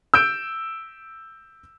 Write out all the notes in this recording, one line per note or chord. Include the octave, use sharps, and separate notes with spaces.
E6 G6 D7